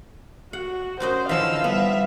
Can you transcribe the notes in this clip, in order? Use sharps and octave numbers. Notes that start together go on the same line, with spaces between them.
F#4 F#5
F#2 F#4 C5 D#5
D3 E3 F3 C#4 D#5 F5 E6
G3 B3 E5